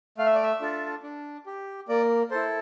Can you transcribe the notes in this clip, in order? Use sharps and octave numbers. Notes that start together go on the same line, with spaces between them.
A3 F5
E5
D5
E5
D4 F4 A4
D4
G4
A#3 D5
E4 A4 C5